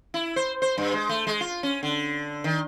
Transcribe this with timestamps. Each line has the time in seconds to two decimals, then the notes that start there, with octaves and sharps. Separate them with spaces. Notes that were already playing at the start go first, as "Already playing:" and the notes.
0.14 E4
0.36 C5
0.62 C5
0.78 G2
0.93 G#3
1.09 A3
1.27 G#3
1.41 F4
1.63 C#4
1.83 D3
2.44 D#3